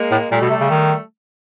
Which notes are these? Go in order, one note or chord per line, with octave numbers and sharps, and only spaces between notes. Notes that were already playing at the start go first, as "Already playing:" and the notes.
Already playing: G#3 A#3
A2
A#2 G3 A3
B2
C3
C#3
D#3